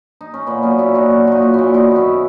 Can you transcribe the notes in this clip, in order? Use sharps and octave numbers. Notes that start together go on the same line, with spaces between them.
D#4
C#4
A#2 B3
F#3 A#3 C#4
A#2 C#4 E4
A#2 D#4 F#4
F#3
A#2 D#4 F#4
A#2
A#2 C#4 E4
D#3 B3 D#4
F#2 C#4 E4